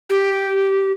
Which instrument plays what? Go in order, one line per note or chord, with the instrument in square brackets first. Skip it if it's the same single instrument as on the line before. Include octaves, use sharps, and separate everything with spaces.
[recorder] G4